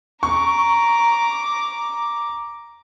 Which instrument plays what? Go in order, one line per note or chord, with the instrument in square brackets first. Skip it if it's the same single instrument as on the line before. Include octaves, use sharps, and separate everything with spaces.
[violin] A#5 D6 [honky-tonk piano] C#6